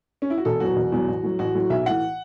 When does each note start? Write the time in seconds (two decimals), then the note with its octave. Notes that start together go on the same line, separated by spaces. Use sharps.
0.22 C#4
0.30 E4
0.38 F#4
0.45 E1 A4
0.60 E2 B2 F#3 F#4
0.76 E1
0.92 E2 B2 F#3
1.08 A1
1.23 A2 F#3
1.39 A1 F#4
1.55 A2 F#3
1.70 B1 E5
1.86 A2 E3 F#5